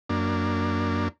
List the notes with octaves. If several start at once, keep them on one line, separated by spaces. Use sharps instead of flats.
F#2 A#3 D4